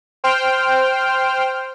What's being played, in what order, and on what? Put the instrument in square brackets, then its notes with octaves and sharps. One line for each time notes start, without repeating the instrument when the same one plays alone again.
[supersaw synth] C5 G5 F6